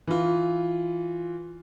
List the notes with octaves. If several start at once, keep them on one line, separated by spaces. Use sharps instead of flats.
E3 F4